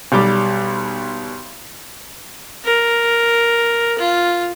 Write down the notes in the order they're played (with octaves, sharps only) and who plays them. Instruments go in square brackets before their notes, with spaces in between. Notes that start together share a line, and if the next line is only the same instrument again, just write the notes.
[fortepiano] B1 G3 D6
[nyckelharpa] A#4
F4